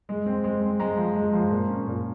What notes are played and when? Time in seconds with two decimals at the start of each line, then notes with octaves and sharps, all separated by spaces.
0.09 G#3
0.26 C4
0.44 G#3
0.62 C4
0.80 G#3 A#5
0.97 F3
1.16 G#3
1.33 F3
1.51 A#2
1.69 C#4
1.87 A#2